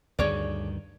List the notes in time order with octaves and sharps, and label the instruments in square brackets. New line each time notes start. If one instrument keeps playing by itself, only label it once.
[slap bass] D2 G2 D#3 [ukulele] G#4 C#5 D5